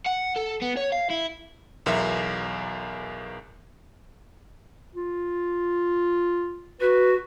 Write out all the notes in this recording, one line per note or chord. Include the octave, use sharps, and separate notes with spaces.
F#5
A4
B3
C#5
F5
E4
B1 E2 A#4 E5
F4
F#4 B4